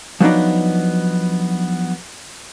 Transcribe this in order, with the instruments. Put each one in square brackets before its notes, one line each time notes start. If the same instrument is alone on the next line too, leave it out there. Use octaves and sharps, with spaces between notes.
[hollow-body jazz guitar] F3 F#3 B3 D4 D#4